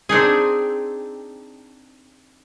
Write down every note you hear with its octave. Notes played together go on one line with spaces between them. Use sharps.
C4 D4 D#4 G#4